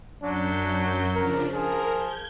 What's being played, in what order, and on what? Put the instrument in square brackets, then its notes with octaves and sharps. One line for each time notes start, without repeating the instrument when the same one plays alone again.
[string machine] F#2 G6 [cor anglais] F#3 [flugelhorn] D4
[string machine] C#3 F3 D4 [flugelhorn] A#4
[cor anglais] F3 [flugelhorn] G#4 [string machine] A#4
[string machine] G6 G#6